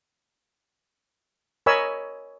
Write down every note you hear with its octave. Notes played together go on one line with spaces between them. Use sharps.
A#4 C#5 D#5 G#5 B5 E6